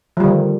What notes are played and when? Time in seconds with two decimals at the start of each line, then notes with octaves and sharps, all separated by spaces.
0.17 F3
0.20 G3
0.24 D3
0.27 D#3